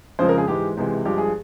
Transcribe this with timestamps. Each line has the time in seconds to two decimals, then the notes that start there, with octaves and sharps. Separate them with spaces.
0.19 F2 C#3 F3 G#3 C5
0.28 A#4
0.38 G#4
0.47 G#2 E3 G#3 G4
0.77 C#2 C3 E3 G#3
1.05 G2 F3 G#3 G4
1.18 G#4